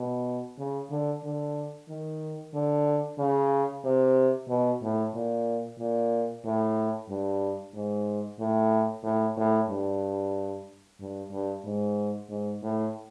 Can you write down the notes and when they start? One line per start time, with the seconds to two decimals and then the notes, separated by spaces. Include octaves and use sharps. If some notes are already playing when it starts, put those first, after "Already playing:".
Already playing: B2
0.58 C#3
0.91 D3
1.24 D3
1.89 D#3
2.54 D3
3.19 C#3
3.84 C3
4.48 B2
4.82 A2
5.15 A#2
5.79 A#2
6.45 A2
7.10 G2
7.74 G#2
8.40 A2
9.04 A2
9.37 A2
9.69 G2
11.00 G2
11.32 G2
11.65 G#2
12.30 G#2
12.63 A2